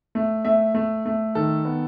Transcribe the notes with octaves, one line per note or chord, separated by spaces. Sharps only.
A3
A3 E5
A3
A3
D#3 A4
B3